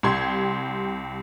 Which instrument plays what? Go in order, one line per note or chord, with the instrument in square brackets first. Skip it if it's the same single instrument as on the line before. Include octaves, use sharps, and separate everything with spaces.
[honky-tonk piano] C2 G4 C6 G#6